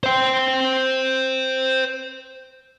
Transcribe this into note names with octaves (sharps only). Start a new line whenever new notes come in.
C5 G5